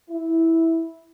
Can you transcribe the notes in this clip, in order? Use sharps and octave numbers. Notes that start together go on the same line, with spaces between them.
E4